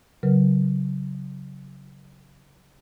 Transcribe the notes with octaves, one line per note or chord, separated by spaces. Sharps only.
C#3 F#3 A#4 B4